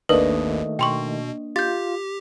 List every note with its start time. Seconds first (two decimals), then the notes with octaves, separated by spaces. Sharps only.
0.09 G#1 D#2 D#3 A3 A#3 D4 B4 D#5
0.79 B2 G5 C6 C#6
1.56 F4 G4 G6 A6